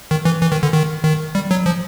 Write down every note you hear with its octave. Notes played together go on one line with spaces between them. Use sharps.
D#3
E3
E3
D#3
D3
D#3
D#3
G3
F#3
F3